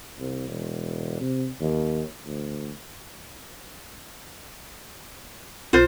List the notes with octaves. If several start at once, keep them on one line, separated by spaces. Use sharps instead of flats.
C2
E1
C3
D#2
D2
B1 F4 C5